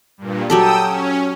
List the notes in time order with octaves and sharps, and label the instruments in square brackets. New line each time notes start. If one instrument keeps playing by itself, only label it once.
[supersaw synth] G2 A#2
[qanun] F#3 G4 A4 [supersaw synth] G5 D#6 E6
[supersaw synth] C#4